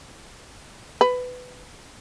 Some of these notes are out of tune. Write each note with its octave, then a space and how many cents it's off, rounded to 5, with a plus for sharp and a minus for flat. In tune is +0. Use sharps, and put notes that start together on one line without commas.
B4 +15